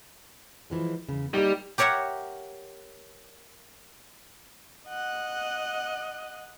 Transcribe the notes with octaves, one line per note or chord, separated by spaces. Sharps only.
E3 F3 G#3
E2 C#3
G3 A#3 D#4
G4 A#4 C#5 E5 F#5
D#5 F#5